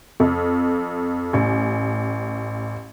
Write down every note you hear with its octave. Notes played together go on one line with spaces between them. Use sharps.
F2
A1